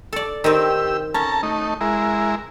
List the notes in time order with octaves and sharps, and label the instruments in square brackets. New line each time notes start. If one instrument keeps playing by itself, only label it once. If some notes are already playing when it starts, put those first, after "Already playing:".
[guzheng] A4 D5
[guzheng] D#3 C4 [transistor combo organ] G4 E6
[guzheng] C#4 [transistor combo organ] A4 A5 A#5
[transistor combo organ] A3 D#4
G#3 E4 A#4